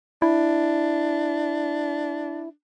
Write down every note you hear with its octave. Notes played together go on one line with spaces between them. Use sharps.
D4 E4